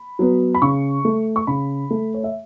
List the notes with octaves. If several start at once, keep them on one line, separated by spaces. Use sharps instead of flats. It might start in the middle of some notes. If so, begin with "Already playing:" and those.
Already playing: B5
F#3 B3
B5
C#3 C#6
A3
C#6
C#3 B5
A3
C#5
E5